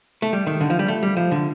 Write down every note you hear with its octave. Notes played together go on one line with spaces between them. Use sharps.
A3
G3
D#3
D3
F3
G3
A3
G3
F3
D3